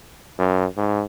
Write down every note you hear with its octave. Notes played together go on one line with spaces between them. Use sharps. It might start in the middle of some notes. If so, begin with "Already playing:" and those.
F#2
G#2